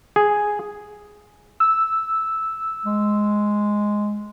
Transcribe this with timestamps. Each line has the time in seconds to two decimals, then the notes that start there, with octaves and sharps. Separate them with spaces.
0.16 G#4
1.60 E6
2.85 G#3